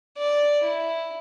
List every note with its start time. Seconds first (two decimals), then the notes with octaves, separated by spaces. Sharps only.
0.18 D5
0.64 E4